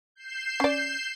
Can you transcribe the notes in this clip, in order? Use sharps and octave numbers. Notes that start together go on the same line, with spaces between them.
G6 C7 E7
C#4 D5